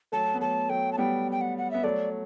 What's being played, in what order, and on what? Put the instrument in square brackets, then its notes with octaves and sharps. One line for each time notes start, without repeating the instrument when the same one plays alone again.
[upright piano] F#3 A3 [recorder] A5
[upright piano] B3
[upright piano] F#3 A3 [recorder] A5
[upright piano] F#3 A3 [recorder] G5
[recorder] A5
[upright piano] G3 B3 [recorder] G5
[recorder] G5
F#5
F#5
[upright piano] B3 [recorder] E5
[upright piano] F#3 A3 [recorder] D5